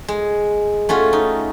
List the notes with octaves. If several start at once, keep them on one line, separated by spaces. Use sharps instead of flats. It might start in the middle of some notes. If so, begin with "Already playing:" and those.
G#3
A3 C#4 F4 F#4
D#4